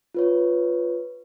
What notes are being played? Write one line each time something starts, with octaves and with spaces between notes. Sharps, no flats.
F4 B4 C#5